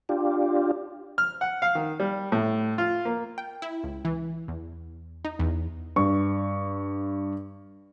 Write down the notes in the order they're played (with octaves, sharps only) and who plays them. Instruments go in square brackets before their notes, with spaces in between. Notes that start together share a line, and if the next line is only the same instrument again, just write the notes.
[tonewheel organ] D4 F4 G4
[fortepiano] F6
F#5
F5
D#3
G3
A2
F4
A#3
[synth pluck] G5
E4
C#2
E3
E2
D#4
E2
[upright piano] G2 C#6